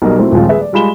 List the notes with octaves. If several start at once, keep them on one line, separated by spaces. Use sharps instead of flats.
B1 B2 G3 A#4 D#5
F#3 A3 C4 E4 C5
D#1 F3 G#3 C4 F4
G#4 B4 E5
D5
G3 G#3 F4 B5 E7 G7